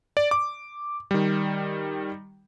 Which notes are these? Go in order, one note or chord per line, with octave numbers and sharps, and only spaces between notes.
D5
D6
D#3 G3